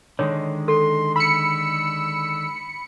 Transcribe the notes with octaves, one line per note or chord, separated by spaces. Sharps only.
D3 D#3 G#3 C#5
A4 C6
B5 E6 C#7